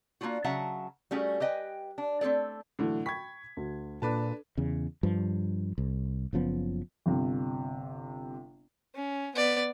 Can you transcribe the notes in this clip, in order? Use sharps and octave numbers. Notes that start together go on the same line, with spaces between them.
A#3 C4 D4 F4 F#4
C#3 F#3 E5 F#5 A5 A#5
G3 A3 C#4 F#4 G#4
G4 B4 D#5 G5 G#5
D4
A3 C4 G#4 A4 D5
A2 D3 E3 F#3 A3
G5 B5 C#6 G#6 B6
D2
A#2 D4 A4 B4 A5
E2 C#3
G2 F3
C2
F#1 C#3 F3 B3
G1 C3
C#4
B3 D5